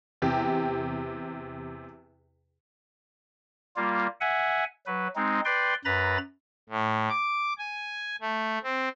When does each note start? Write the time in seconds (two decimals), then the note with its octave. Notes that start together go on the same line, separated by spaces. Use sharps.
0.22 E2 C3 G4
3.76 G3 A#3 F4
4.21 E5 F#5 G#5
4.86 F#3 B4
5.16 G#3 C4 D#4
5.45 B4 D5 G5 C6
5.85 F#2 B4 A#5 B5 A6
6.69 A2
7.10 D6
7.58 G#5
8.21 A3
8.63 C4